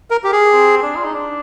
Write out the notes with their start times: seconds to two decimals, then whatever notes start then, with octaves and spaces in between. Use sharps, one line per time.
0.10 A#4
0.24 G4
0.32 G#4
0.52 C4
0.83 D4
0.96 F4
1.04 D#4
1.14 D4